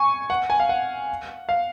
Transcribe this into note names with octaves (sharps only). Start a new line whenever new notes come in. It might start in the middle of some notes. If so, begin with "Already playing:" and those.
Already playing: G#5 C#6
F#5
G#5
F5
F#5
F5